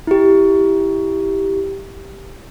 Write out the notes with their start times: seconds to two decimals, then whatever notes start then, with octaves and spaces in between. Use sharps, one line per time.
0.07 E4 G4